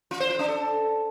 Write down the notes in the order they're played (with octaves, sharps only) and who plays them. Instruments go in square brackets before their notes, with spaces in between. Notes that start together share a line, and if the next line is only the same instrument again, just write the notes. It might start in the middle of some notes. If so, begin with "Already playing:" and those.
[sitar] F4
C5
F4
D4
A4